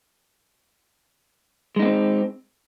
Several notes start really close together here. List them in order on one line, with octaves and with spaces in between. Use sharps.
G#3 D#4 A#3 C4